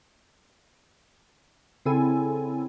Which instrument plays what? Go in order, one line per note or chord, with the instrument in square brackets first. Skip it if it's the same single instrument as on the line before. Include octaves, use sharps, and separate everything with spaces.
[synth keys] C#3 C4 E4 A4 G#5